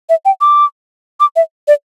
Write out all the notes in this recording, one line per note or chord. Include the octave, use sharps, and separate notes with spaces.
E5
G5
D6
D6
E5
D5